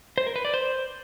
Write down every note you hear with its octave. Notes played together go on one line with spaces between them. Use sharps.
C5
A#4
B4
D5
C5